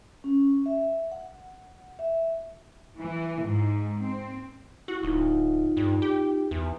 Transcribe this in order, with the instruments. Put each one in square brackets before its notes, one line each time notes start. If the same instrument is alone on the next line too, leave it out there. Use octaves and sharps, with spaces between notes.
[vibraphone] C#4
E5
F#5
E5
[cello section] E3
G#2
C4
[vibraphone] E4 [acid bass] F#4
[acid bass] D1 [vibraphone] D#4 F4
[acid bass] G2
G4
E2